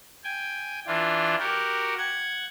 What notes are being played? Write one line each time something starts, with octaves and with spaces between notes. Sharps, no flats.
G5 G#5
E3 D4 F4
F#4 G4 A#4
F#5 G#6